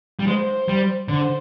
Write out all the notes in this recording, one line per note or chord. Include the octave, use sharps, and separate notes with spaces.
G3
G#3 C5
G3
D3 C5